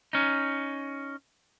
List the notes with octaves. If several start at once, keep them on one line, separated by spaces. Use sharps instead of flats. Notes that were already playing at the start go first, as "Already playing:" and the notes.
C#4 D#4